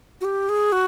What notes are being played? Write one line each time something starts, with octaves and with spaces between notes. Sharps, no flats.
F#4
G4
G#4
F#4